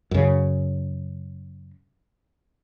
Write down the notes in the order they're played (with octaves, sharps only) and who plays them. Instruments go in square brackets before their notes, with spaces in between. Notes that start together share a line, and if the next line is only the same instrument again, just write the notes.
[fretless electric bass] F#2 C#3